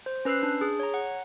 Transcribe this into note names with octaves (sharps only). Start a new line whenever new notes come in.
C5
C#4 B4 E6 F#6 C7
D4
G#4
C#5 A#5
F#5